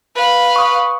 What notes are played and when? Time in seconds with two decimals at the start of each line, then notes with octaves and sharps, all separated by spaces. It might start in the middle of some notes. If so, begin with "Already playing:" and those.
0.15 B4 F5
0.56 C#6 D#6